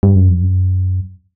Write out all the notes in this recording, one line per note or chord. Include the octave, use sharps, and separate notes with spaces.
G2
F#2
F2
F#2